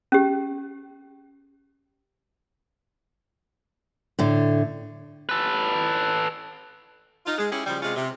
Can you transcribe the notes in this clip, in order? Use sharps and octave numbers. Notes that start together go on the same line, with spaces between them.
C#4 G4
A2 D3
A4 B4
D#4 F4
G#3
C#4 E4 G4 G#4
C#3 F3 G3
C3 G#3 C#4 F4
C3